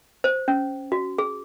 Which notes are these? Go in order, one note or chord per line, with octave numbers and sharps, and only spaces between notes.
C5
C#4
F#4
G#4